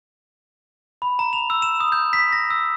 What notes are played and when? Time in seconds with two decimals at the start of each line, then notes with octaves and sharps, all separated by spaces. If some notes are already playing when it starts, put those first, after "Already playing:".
1.02 B5
1.19 A#5
1.33 F7
1.50 E6
1.62 E7
1.80 D#6
1.92 G6
2.13 B6
2.32 A#6
2.50 E6